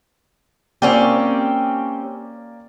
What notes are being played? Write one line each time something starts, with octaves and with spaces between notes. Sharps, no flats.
A#3 C4 C#4 F4 G4 D5